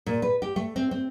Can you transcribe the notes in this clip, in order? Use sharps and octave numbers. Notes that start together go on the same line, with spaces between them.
A#2
B4
G4
A3
C4
C4